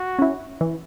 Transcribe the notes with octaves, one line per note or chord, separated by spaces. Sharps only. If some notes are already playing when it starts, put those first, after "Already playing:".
Already playing: F#4
C#4 E4
E3